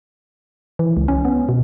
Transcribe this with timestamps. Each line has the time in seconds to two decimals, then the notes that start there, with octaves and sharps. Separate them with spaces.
0.79 E3
0.97 C#2
1.08 C#4
1.25 B3
1.49 B2